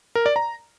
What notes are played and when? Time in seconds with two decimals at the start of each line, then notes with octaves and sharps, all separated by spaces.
0.15 A#4
0.26 D5
0.36 A#5